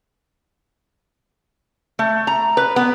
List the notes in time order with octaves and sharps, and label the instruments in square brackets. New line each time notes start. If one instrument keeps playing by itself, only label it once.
[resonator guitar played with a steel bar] A3
A#5
B4
B3